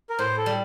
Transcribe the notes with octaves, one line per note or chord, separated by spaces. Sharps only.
A#4
A2 C5
A4
G3